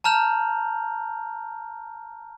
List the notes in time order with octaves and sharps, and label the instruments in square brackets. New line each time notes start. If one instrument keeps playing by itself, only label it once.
[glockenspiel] A5 A#5 F6 G6 F7